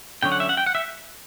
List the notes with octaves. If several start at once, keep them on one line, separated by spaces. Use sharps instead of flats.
D3 F#3 C#4 G5
F#5
E5
F#5
G5
F#5
E5